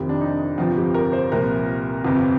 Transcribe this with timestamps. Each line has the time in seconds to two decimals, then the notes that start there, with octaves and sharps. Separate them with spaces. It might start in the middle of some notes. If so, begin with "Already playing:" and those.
Already playing: F1 F2 D#3 G4
0.09 D4
0.21 D#4
0.58 G1 F2 C3 F3 F4
0.77 G4
0.94 A#4
1.13 C5
1.32 C2 A#2 F3 A#4
2.05 G1 F2 C3